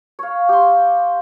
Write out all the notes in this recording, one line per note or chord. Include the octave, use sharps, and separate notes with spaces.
C#5 F5
G4 C6